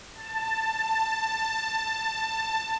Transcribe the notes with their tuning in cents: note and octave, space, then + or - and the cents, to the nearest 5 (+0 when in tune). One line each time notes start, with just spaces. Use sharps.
A5 +15